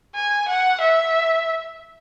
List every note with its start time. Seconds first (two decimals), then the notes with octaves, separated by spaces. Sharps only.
0.15 G#5
0.48 F#5
0.80 E5